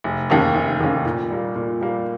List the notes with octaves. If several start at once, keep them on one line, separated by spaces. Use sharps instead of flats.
F1
D#2 D#3 A#3 C#4
F1
D#2 D#3 A#3 C#4
A#2
G3 A#3
A#2
G3 A#3